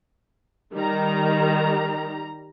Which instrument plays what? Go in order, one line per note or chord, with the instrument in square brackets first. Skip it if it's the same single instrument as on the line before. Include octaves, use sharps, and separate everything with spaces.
[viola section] D#3 [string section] G3 A#5